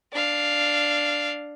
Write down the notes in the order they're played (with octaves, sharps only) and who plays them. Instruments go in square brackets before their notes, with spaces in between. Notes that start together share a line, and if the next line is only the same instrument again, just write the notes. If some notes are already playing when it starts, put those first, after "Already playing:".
[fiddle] D4 F5